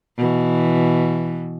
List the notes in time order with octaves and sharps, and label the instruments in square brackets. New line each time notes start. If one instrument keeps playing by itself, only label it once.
[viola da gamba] B2 E3